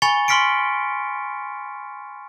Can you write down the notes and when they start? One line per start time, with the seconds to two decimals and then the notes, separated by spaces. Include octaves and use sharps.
0.02 G#5 B5 C#6 A6 C#7 G7
0.28 C6 C#6 F6 B6 C#7 D7